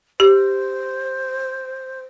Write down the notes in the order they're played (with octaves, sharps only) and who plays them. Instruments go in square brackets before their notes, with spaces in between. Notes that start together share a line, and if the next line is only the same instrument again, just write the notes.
[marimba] G4 [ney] C5